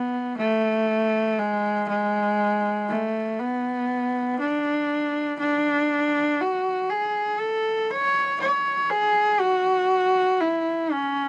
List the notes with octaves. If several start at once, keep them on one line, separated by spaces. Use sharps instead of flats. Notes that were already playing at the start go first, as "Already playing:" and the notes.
Already playing: B3
A3
G#3
G#3
A3
B3
D4
D4
F#4
G#4
A4
C#5
C#5
G#4
F#4
E4
C#4